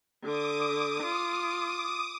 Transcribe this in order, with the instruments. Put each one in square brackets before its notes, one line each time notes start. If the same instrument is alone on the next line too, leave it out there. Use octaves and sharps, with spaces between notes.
[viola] D3 [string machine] D6 D#6
[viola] F4